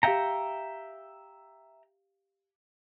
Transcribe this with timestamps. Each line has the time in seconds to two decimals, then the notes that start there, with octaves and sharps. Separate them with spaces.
0.03 G4 E5 F5 G5 A#5 C#7